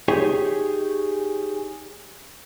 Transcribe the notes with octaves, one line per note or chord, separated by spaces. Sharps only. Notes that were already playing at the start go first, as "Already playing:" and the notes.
D#4 G4 G#4 C#5